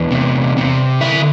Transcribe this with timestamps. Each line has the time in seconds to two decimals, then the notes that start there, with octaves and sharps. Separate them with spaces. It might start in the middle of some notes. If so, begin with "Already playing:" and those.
Already playing: E2 D4 D5
0.11 C3
0.57 C3
1.01 D3 E4 E5